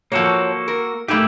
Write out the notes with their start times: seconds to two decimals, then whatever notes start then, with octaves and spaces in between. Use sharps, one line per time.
0.12 F3 A#3 F#4 A4 C#5
0.68 A#4
1.08 A3 A#3 D#4 E4 G4